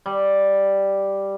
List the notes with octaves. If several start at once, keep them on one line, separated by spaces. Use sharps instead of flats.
G3